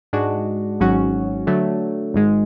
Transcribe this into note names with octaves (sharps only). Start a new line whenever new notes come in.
G#2 G#3 D4 F#4
G#1 G#2 F#3 C#4 F#4
D3 F#3 A3
G#1 G#2 G#3